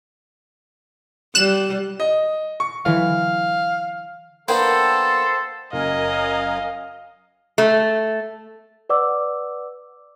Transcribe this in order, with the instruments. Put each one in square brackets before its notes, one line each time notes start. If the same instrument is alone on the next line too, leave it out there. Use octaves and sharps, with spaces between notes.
[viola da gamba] G3 [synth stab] F#6 E7
[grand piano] D#5
C#6
[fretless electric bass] D3 E3 F#3 [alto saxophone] F5
[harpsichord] A#3 B3 D4 [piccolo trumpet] A4 [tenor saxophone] C5 [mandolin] G5
[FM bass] F#1 [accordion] F#2 A#4 G#5 [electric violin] D#5 [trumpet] F5
[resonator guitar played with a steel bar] A3
[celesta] B4 D5 F#5 D6 E6